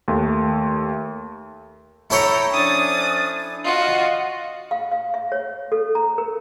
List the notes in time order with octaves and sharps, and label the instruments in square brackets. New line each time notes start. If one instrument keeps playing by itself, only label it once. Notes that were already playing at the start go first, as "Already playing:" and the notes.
[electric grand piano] D#2 A3
[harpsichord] E4 A4 C#5 [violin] G5 A#5
[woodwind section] F3 C#4 D4 [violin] D#6 A6
[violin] F4 F#4 [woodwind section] D#5 F5
[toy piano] F5
F5
E5
C#5
A4
A#5
A#4